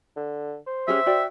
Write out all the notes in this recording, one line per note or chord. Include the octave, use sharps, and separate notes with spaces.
D3
C5
C#4 G4 G#4 E5
F#4 D5 G5